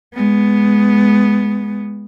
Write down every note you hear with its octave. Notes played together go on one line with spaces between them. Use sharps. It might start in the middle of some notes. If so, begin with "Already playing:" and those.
G#3 B3